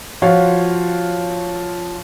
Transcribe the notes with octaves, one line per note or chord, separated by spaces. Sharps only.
F3 F4 F#4 C#5 F5